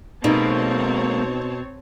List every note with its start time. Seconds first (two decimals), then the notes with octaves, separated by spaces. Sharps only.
0.24 B2 G#3 A#3 C4 D#4 C#5 A5